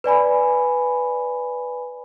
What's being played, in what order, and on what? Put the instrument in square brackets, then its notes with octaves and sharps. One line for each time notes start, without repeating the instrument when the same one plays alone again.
[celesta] B4 D5 G#5 B5